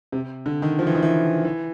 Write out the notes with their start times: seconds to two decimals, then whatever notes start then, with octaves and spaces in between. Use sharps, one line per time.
0.12 C3
0.46 D3
0.62 D#3
0.79 F3
0.87 E3
0.95 D#3
1.02 E3
1.45 E3